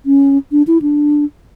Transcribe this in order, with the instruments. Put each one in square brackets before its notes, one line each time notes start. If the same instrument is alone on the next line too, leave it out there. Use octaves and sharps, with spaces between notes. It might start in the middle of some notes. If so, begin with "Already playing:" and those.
[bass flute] C#4
D4
E4
D4